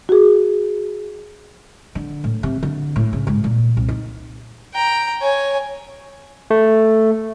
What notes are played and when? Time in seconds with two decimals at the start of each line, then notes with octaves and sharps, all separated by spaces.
0.09 F#4 G#4
1.95 D3
2.24 A2
2.43 C3
2.63 D3
2.96 A2
3.13 C#3
3.27 G#2
3.44 A#2
3.77 C2
3.89 D#4
4.74 G5 A#5
5.21 C#5 G#5
6.51 A3